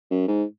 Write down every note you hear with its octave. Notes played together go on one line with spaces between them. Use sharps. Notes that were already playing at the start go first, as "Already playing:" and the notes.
F#2
G#2